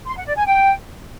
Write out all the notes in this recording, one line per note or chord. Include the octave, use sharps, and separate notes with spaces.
C6
F#5
D5
G#5
G5